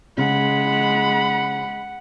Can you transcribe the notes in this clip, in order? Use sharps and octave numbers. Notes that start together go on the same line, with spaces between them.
C#3 G#3 F#5 B5